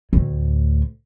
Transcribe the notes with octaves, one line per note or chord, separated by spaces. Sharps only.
D2 A2